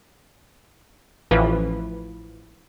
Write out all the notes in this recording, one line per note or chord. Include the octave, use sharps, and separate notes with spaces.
A1 E3 F3 B4